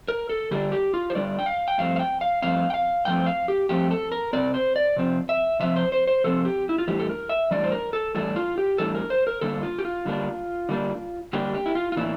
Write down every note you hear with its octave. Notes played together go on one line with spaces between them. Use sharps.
A#4
A4
D3 G3 D4 G4
G4
F4
C5
D3 G3 D4 D5
G5
F5
G5
G2 F3 A3 C4 F5
F5
G5
F5
G2 F3 A3 C4 F5
G5
F5
G2 F3 A3 C4 G5
F5
G4
G2 F3 A3 C4 G4
A4
A#4
C3 F3 C4 D5
C5
D5
C3 F3 C4
E5
C3 F3 C4 E5
C5
C5
C5
C3 F3 C4 A4
G4
E4
F4
A2 E3 G3 D4 G4
A4
A#4
E5
A2 E3 G3 D4 D5
C5
A#4
A4
A2 E3 G3 D4 A4
F4
G4
A2 E3 G3 D4 A4
A#4
C5
A#4
D3 G3 A#3 D4 A4
F4
G4
F4
D3 G3 A#3 D4
D3 G3 A#3 D4
D3 G3 A#3 D4 G4
G4
E4
F4
F4
A2 E3 A#3 D4 E4